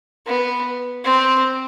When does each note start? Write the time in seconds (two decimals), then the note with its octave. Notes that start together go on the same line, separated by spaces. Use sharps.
0.27 B3
1.04 C4